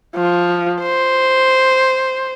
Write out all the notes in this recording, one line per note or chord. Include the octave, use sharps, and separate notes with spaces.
F3
C5